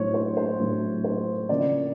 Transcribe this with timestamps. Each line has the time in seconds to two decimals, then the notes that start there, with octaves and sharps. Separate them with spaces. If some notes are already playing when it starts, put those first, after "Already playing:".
Already playing: A2 F#3 A3 D4 C5 C#5
0.14 C5
0.37 C5
0.59 A2 F#3 A3 D4
1.04 C5
1.49 C#3 F3 A#3 D4 D5